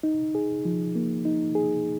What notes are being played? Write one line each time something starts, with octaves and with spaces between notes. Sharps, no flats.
D#4
G#4
F3
A#3
D#4
G#4